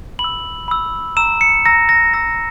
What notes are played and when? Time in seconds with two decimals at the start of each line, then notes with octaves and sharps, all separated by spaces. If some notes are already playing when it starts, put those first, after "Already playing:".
0.19 B5 F#7
0.24 E6
0.68 B5 E6
1.17 A#5 E6 E7
1.41 C#7
1.66 A#5 E6 A#6
1.89 A#6
2.13 A#5 E6 A#6